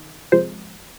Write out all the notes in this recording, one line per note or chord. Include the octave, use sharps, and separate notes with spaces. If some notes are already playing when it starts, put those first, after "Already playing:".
Already playing: D#3
C3 F3 G#3 C5